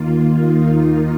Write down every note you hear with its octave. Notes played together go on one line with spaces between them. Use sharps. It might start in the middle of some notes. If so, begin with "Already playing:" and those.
Already playing: D#2 D#3 A#3 F4
D#4